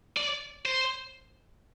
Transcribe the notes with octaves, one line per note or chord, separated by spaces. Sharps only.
D5
C5